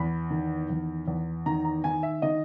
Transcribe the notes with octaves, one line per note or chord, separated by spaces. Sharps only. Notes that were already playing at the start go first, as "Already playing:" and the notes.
Already playing: E2 B5
D#3
E2
E2
D#3 A#5
A#5
D#3 G#5
E5
D#3 D#5